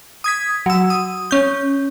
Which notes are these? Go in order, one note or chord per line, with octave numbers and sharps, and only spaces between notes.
D#6 G#6 B6
F#3 E6
D#6
C#4 G6